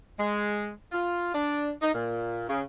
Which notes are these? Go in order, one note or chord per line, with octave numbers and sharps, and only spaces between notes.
G#3
F4
D4
D#4
A#2
C#3